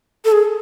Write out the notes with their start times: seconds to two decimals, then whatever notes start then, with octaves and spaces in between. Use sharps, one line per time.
0.25 A4
0.32 G#4